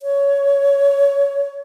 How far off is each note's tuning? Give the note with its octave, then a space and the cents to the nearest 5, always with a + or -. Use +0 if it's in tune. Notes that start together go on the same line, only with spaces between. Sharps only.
C#5 +15